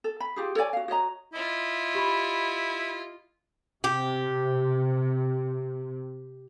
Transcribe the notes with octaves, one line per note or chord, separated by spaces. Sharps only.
A4
B5
F4 G4 G#4
A4 C#5 D5 G#5
F#4 F5
F#4 C#5 D#5 A#5
E4 F4 D#5
G4 B5
C3 G4